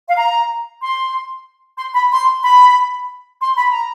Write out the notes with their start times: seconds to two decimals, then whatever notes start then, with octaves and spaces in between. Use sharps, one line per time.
0.09 F5
0.17 A#5
0.82 C6
1.78 C6
1.95 B5
2.11 C6
2.43 B5
3.40 C6
3.56 B5
3.72 A#5